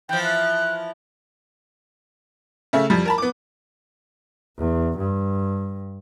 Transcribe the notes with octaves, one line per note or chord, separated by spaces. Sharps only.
E3 F3 G5
F#6
C#3 A3 E5
F2 G3
A#4 A5 B5
B3 D6
E2
G2